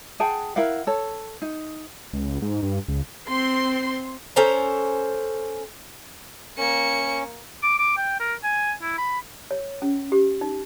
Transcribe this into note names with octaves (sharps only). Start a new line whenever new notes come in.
G#4 F#5 G5 A5
E4 A#4 F5 F#5
A4 C#5
D#4
C#2
G#2
G2
C#2
C4 C6
C#4 A4 C5 A#5
A#3 C#4 C#7
D6
D6
G5
A#4
G#5
E4
B5
C#5
C#4
G4
D#4